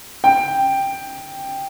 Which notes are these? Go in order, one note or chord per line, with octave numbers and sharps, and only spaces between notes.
G5